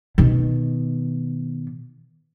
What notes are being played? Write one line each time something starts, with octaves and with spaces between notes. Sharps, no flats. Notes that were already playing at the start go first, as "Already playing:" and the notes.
B2 D#3